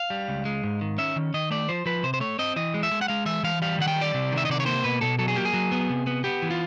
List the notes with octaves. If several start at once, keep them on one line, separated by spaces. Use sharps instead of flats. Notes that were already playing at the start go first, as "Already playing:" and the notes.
Already playing: F5
G3
C#2
G#3
G#2
D#3
C#4 E5
D#3
D#3 D#5
A3 D5
F3 C5
F3 B4
C3 C5
C5
A3 C#5
C4 D#5
E3 D#5
G#3
E5
G#3
F#5
G#3 F5
E3 E5
E3 F5
G3 F5
D#3 F#5
G5
G3
D5
C3
D#3
E5
D#5
C3 D5
C#5
A#3 C5
B2 B4
B2 A4
F#3 A4
G#4
A#3 G4
G#4
F#3
B3
C3
B3
B3 G4
E3
F4